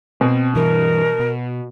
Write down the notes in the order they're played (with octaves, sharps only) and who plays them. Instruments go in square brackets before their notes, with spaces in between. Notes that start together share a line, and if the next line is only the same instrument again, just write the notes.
[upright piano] B2 [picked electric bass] C4
[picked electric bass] G2 E3 [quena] A#4
[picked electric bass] B2